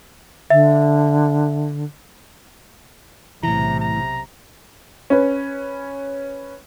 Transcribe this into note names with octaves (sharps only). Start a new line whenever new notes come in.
D3 E5
B1 A2 C3 E3 A#5
A#5
C#4 B4